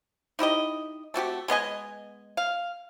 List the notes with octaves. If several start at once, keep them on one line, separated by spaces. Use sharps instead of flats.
D#4 E4 G4 D#5
A3 C4 F#4 G4
G#3 B3 D#5 G#5
F5